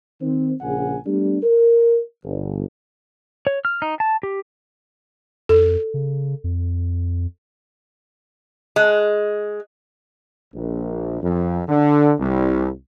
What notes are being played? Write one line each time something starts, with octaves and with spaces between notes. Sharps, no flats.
D#3 C4
A#1 C#3 G#4 F#5 G#5
G3 A3 B3 D4
A#4
G1
C#5
F6
D#4
A5
G4
F2 A4
C#3
F2
G#3
A#1
F2
D3
C2